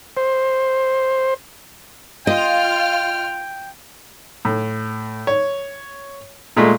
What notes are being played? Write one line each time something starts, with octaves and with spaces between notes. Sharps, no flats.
C5
F4 D#5 G5 F6
A2
C#5
A#2 G#3 A3